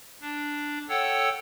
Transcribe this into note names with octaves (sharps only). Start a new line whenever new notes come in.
D4
A4 C#5 F#5 G5 E6